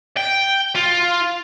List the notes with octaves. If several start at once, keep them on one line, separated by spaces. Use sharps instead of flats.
G5
F4